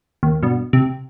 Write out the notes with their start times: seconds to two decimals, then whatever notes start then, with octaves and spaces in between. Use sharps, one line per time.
0.23 D#2
0.43 G2 B2
0.73 C3